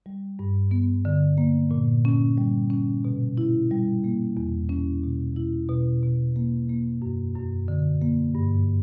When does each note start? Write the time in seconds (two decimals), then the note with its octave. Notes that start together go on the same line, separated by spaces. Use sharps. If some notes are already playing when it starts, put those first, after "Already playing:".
0.06 G3
0.39 G2
0.71 B3
1.05 D3
1.38 A#3
1.71 A#2
2.05 C#4
2.38 G3
2.70 C#4
3.05 B2
3.38 E4
3.71 G3
4.04 A#3
4.37 E2
4.69 C#4
5.04 B2
5.36 E4
5.69 B2
6.03 B2
6.36 A#3
6.69 A#3
7.02 F#2
7.35 F#2
7.68 D3
8.02 A#3
8.35 G2